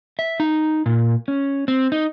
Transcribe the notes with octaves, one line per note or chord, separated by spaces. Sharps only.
E5
D#4
A#2
C#4
C4
D#4